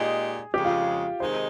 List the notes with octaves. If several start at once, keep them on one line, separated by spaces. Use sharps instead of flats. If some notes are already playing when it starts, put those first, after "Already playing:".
Already playing: A#2 G#3 D#4 G4 G#4
F2 C#3 G#3 G4
F4
C3 D#3 G#3 D#4 C5